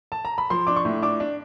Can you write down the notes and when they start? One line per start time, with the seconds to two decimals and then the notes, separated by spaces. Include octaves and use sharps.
0.12 A5
0.25 A#5
0.38 B5
0.50 F3 C6
0.67 D4 D6
0.76 C#6
0.85 A2
1.02 D4 D6
1.20 D4